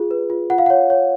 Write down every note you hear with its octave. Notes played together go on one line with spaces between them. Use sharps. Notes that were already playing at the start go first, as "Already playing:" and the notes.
Already playing: F4 G#4
B4
F4
F4 F#5
F5
C#5 F#5
C#5